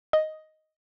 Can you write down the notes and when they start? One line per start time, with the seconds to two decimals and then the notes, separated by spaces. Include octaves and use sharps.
0.13 D#5